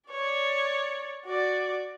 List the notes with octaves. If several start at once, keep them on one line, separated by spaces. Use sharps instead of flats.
C#5 D5
F#4 D5